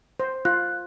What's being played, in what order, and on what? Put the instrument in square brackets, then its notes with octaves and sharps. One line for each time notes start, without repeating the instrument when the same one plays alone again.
[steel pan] C5
[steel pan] F4 [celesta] F#6